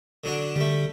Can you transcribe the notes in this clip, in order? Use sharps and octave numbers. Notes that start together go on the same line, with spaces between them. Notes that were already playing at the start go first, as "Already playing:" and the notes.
D3 F#3 D4
D3 G3 A3